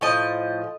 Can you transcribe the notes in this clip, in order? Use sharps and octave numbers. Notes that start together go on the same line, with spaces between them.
A2 F3 D#5